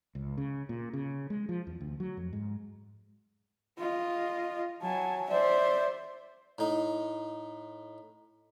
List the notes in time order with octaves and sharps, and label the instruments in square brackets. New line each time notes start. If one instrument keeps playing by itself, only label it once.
[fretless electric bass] C#2
C#3
A#2
C#3
G#3
F3
E2
D2
F#3
F2
G#2
[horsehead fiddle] F4 D#5
[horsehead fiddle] F#3 G#5 [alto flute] A5
[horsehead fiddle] C5 E5 [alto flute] D5
[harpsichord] A2 D#4